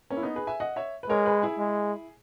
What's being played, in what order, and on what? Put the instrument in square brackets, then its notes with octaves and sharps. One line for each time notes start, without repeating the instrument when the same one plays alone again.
[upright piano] A#3 C#4
E4
B3 D#4
G#4 B4
E5 G#5
D#5 F#5
C#5 E5
B4
[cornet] G#3 [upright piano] A#4 C#5
[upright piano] G#4 B4
E4 G#4
[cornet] G#3